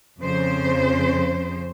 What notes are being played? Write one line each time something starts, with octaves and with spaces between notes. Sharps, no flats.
F2 C#3 C5